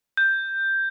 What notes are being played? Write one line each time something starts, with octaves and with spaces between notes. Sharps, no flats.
G6